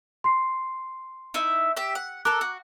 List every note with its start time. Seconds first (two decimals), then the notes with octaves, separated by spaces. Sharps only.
0.24 C6 C7
1.34 D#4 E4 E5
1.77 G4 E5
1.95 F#5
2.25 A4 A#4 A#5 D6 F#6
2.41 F#4